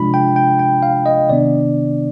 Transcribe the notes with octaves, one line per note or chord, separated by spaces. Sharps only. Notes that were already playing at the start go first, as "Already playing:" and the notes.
Already playing: C3 F3 G#3 D4 F4 B5
G5
G5
G5
F5
D#5
C3 D#3 B3 D4 D5